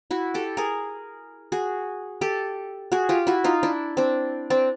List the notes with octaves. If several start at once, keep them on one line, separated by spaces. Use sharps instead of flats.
E4 F#4
G4 A4
G#4 A#4
F#4 G#4
G4 A4
F#4 G#4
F4 G4
E4 F#4
D#4 F4
D4 E4
C4 D4
C4 D4